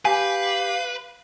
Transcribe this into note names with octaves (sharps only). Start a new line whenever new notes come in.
G4 B4 F5 G#5